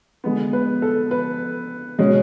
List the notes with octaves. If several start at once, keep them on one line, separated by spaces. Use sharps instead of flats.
D3 G#3 B3
B4
A4
B4
B2 G#3 C#4